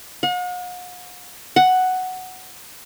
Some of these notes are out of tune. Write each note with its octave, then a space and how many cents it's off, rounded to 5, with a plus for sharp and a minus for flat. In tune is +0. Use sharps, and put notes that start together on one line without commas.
F#5 -45
F#5 +5